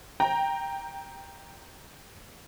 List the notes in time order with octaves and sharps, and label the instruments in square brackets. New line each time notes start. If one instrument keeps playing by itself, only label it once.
[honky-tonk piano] G5 A#5